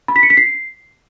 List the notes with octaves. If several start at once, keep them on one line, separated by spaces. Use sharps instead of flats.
B5
B6
C#7
B6
C7